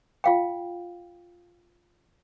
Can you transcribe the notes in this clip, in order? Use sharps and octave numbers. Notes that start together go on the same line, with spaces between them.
F4 F5 G5